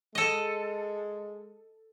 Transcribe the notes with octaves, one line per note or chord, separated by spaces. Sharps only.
G#3 A4 D#5